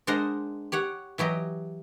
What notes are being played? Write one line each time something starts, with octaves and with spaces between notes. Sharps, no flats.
G#3 D4 A#4 C5 D#5 F#5
G4 C#5 F#5
E3 F#3 G4 D#5